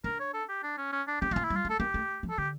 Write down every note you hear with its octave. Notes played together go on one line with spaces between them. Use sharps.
D4 A#4
C#5
A4
G4
D4
C#4
C#4
D4
C#4 G4
A3 A#3 F4
E4
G3
F4
A3
A4
A#3 G4
A3
F3
A4
D3 G4